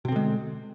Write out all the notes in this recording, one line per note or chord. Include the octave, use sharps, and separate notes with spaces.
B2 D3 G#3 C4